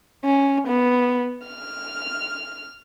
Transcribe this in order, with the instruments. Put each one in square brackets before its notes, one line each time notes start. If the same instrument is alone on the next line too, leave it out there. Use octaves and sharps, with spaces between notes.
[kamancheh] C#4
B3
F6